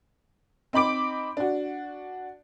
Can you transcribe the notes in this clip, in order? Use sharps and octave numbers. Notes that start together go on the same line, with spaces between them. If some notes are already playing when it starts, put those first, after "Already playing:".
C4 D#4 B5 D6 D7
D4 F#4